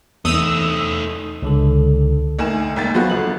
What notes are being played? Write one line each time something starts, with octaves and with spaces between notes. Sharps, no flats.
E2 A3 D#4 D#6 E6
C#2 D3 A4
D2 D#3 G#5 E7
G#1 D#2 A6
F3 F#3 B3 F#4
A#1 D3 F#7